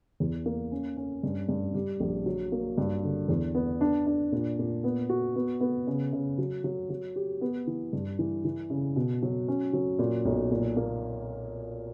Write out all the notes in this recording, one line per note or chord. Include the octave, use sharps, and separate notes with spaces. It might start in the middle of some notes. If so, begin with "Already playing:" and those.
E2
A#3
C#4
C#4
G2
G2
G3
A#1
F#3
A#3
G2
D3
E2
B3
D4
D4
A#2
A#2
B3
F#4
B3
B3
C#3
C#3
F#3
F#3
F#3
G4
B3
E3
G2
E3
E3
C#3
B2
F#3
C#4
F#3
A#2
B1
A#2
A#3